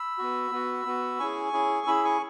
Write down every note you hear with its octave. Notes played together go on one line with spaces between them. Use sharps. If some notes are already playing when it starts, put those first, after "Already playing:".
Already playing: B5 E6
B3 F#4
B3 F#4
B3 F#4
C#4 E4 G#4 G#5 C#6
C#4 E4 G#4
C#4 E4 G#4 B5 E6
G#5 C#6